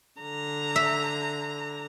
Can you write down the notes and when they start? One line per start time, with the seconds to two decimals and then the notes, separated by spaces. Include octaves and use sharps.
0.21 D3 A#5
0.76 E5